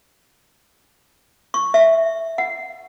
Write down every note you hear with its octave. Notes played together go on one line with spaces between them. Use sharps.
C#6
E5
F#5